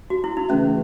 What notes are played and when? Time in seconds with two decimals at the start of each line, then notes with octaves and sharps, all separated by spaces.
0.10 F#4
0.24 E4
0.37 D#4
0.50 C#3 E3 A3 C#4